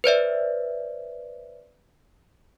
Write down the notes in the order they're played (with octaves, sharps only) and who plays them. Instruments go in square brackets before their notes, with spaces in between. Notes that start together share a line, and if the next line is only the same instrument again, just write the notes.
[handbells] B4 C5 D5 E5